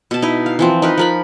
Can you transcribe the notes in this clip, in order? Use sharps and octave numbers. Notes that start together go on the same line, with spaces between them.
B2 A5
D#4 E4
F5
E3 F3 C4
D#4 A#4 B4
F3 A#4 B5